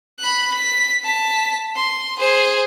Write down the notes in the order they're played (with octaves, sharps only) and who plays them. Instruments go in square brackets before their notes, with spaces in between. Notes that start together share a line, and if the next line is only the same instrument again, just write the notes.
[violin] B5 F#6
B6
A5 B6
C6
G#4 C5